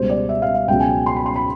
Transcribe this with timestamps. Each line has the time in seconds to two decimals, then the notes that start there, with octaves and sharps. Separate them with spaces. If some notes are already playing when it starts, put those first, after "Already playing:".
Already playing: C#2 B2 G3 C5
0.10 D5
0.29 E5
0.42 F5
0.55 F5
0.68 C#2 B2 F#3 G5
0.80 G#5
1.06 C6
1.16 B5
1.26 C6
1.36 B5